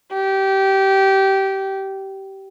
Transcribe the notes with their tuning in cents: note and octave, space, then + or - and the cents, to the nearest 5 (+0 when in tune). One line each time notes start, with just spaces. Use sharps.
G4 -20